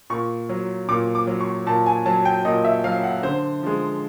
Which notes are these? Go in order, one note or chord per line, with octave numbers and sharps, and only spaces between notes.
A#2 C#6
F#3
A#2 D6
D6
F#3
C#6
A#2 A5
G#5
F#3 A5
G5
A#2 D#5
E5
F#3 F5
F#5
D3 C5
F3 G#3